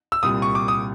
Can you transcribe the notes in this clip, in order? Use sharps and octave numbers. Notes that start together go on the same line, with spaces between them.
E6
C2 A#2 G3 D#6
C#6
D6
D#6